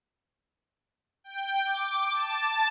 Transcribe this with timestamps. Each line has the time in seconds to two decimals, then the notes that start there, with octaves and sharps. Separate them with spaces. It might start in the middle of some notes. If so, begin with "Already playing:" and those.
1.24 G5
1.66 D6
2.12 A5